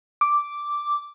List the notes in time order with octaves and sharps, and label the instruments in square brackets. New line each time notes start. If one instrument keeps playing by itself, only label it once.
[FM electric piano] D6